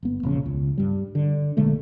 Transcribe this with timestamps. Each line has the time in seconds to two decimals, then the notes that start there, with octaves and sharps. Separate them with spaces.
0.03 G1 B3
0.23 E1 A#1 C#3
0.46 C#2
0.78 G2 G3
1.15 D3
1.57 A#1 D3 G#3 A3